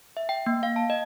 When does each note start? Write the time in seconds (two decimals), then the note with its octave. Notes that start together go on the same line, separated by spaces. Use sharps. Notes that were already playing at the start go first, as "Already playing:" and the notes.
0.17 E5
0.29 G5
0.46 A#3
0.63 F5
0.76 A5
0.90 D#5